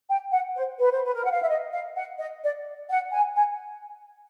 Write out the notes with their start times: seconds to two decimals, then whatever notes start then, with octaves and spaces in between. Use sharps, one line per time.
0.09 G5
0.32 F#5
0.55 C5
0.79 B4
0.92 C5
1.03 B4
1.14 A#4
1.24 F#5
1.32 F5
1.41 E5
1.49 D#5
1.72 F5
1.96 F#5
2.18 D#5
2.42 D5
2.90 F#5
3.13 G#5
3.36 G#5